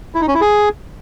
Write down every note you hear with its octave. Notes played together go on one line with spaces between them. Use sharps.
E4
D#4
C#4
E4
G#4